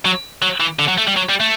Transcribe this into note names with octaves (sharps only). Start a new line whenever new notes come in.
F#3
F#3
E3
D3
F#3
A3
G3
F#3
G3
A3